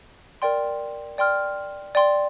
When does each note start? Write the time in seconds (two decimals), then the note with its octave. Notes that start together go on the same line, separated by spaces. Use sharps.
0.42 A#4 D5 G5 C6
1.18 D5 G5 C6 F6
1.95 D5 G5 C6